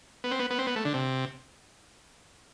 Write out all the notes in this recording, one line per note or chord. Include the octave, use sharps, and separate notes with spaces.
B3
C4
B3
B3
C4
B3
A3
D3
C3